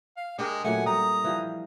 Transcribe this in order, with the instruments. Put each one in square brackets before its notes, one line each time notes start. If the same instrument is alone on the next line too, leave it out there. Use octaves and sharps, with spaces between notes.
[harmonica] F5
[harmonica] G#3 [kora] D4 G4 A#4
[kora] A#2 F#3 A3 [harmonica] F#5 G#5
[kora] G3 [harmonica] A#5 D#6
[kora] E3 F3 G3